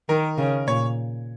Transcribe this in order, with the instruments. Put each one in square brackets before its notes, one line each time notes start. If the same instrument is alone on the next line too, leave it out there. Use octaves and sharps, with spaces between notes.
[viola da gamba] D#3 [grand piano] A#4
[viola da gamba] C#3
[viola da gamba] A#2 [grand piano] C#5